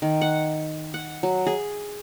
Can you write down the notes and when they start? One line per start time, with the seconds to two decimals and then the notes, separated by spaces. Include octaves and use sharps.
0.02 D#3
0.21 F#5
0.94 F#5
1.23 F#3
1.46 G#4